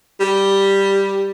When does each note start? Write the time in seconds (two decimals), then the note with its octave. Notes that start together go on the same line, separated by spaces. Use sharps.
0.20 G3